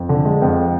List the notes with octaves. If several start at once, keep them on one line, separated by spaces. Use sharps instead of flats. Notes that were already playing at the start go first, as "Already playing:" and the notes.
Already playing: F2
D3
G#3
F2